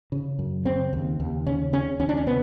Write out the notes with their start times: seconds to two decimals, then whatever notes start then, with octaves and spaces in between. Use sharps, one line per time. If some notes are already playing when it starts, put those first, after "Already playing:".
0.12 C#3
0.39 F#2
0.65 C#3 C4
0.93 D#2
1.20 D#2
1.46 C#3 C#4
1.73 C#3 C#4
1.99 D#2 C#4
2.09 D4
2.17 C#4
2.27 C3 B3